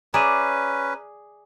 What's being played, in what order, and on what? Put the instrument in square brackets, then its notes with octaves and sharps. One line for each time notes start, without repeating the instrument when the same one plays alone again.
[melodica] C#4 B4 [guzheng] G#4 D5 E5 [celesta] A#5 D#7